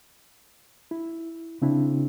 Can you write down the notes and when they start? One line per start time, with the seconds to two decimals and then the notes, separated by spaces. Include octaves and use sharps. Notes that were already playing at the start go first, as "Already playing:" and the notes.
0.91 E4
1.62 C#3 C4 D4 E4